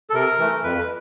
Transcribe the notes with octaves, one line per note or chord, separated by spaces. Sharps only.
A4
C3 A#4
E3 A3
F2 B4